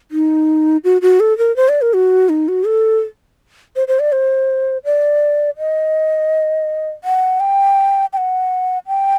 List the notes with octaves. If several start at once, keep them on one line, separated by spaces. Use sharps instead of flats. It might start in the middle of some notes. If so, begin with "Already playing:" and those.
D#4
F#4
F#4
A4
A#4
C5
D5
A#4
F#4
D#4
F#4
A4
C5
C5
D5
C5
D5
D#5
F#5
G5
G5
F#5
G5